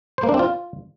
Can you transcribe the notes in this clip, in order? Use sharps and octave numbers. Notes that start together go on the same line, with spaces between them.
C5
A#3
D4
C4
F4